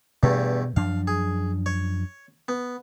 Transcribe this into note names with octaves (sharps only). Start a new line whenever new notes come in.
E2 G2 B2 A3
F#2 F3 D4 F5
G#4
C#5
B3